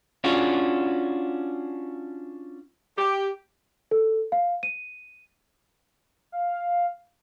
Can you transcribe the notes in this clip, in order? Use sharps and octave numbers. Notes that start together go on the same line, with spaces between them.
C#4 D4 F4 F#4 G#4
G4
A4
F5
D#7
F5